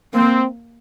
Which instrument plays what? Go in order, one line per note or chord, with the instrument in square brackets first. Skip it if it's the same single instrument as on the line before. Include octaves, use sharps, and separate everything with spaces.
[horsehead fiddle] A#3 [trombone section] C4